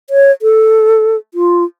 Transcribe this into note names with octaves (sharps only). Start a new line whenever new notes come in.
C#5
A4
F4